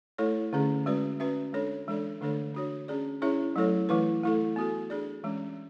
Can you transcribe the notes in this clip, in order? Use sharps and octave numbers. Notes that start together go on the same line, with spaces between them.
A3 E4 A4 C#5
D3 A3 C#4 G#4
G#3 C#4 F#4 B4 D5
C#4 F#4 B4 E5
G#3 D4 A4 C#5
E3 G#3 D4 A4 D5
D3 A3 D4 A4 C#5
D4 F#4 C#5
C#4 G#4 D5
C#4 E4 G#4 C#5 E5
F#3 A3 E4 A4 C#5
E3 A3 E4 B4
A3 E4 A4
B3 F#4 A4
D4 G#4 D5
E3 G#3 C#4